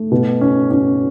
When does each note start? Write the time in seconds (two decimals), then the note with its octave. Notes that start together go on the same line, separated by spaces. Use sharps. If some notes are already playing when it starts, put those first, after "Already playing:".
Already playing: A3
0.12 B2
0.41 C#4
0.71 C#4